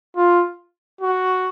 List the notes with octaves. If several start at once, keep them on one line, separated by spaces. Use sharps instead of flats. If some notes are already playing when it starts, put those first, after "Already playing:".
F4
F#4